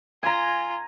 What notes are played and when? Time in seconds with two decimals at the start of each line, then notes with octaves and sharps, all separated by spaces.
0.23 F4 G#5 A#5